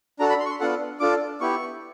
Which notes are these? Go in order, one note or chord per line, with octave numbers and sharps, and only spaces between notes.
D4 F#4 A4 A#5
B5
C6
C#6
C6
B3 D4 F4 A4 F#5
D4 F4 A4 D6
B3 E4 G4 C#6